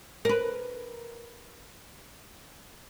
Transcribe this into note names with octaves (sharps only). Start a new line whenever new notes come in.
A#4 B4